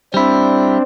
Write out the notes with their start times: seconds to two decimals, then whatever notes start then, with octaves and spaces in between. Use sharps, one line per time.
0.14 G3 C4 D4 E4